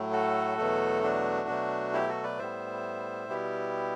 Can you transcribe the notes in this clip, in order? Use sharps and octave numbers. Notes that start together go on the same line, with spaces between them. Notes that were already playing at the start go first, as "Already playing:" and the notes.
Already playing: A2 F#3 A3
F#4 A4
E2 B2 F#3 A3
D4 F#4
B2 F#3 A3
E4 G4
F#4 A4
B4 D5
A2 G3 B3 C5 E5
B2 G3 B3 E4 G4